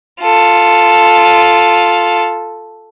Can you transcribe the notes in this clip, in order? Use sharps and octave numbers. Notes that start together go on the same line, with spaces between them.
F4 A4